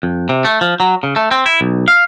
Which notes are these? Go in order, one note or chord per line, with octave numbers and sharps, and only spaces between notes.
F2
C3
A3
F3
F#3
C#3
A3
C4
E4
B1
F5